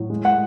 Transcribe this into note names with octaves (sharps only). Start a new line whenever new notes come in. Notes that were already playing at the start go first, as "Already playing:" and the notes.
Already playing: A2 F#3
G#3
F#5